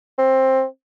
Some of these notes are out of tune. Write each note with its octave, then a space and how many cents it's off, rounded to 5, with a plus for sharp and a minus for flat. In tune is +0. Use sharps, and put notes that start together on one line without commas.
C4 +15